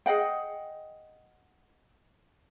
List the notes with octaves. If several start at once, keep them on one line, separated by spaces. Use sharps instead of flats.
G#4 D#5 F#5 G5